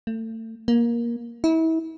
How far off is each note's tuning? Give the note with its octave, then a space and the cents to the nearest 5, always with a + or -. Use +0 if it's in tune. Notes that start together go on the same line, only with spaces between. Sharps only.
A3 +30
A#3 +15
E4 -35